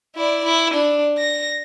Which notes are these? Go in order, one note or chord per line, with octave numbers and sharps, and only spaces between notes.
E4 D5
E4
D4
A#6